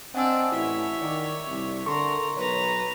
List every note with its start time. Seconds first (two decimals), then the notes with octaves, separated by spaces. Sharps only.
0.15 C4 D4 D5 D#5 F#5 G#5 E6
0.52 A1 E4 C#5 E5
1.02 D#3 D5
1.48 C2
1.86 D3 A4 A#4 C6 C#6
2.37 B1 B4 C#5 A#5